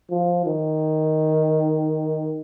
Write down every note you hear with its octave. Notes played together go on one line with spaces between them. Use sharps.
F3
D#3